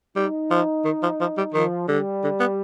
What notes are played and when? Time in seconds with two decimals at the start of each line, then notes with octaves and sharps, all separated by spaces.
0.16 G3 D#4
0.50 F3
0.85 D#3
1.03 F3
1.21 F3
1.37 G3
1.54 D#3 F3
1.88 D3 G3
2.24 D3
2.40 B3